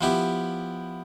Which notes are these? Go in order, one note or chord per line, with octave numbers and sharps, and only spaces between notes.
F3 B3 E4 G4